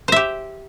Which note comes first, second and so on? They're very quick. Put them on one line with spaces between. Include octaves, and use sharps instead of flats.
C5 E5 G4